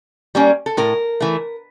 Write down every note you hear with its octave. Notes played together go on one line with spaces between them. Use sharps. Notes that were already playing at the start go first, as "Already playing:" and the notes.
G3 A#3 C#4
A4
A2 A#4
E3 A3